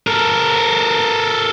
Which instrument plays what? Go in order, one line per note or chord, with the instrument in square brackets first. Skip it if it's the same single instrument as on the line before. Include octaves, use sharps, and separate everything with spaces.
[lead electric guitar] A4 A#4